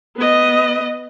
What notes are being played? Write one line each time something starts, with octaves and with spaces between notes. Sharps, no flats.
B3 D#5